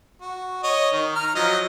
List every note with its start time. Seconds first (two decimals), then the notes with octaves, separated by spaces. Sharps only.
0.21 F#4
0.64 C#5 D#5
0.92 D#3
1.15 A#5 F6
1.35 F3 F#3 D#5